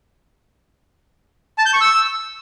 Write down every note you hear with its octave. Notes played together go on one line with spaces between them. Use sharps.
A5
G6
C#6
E6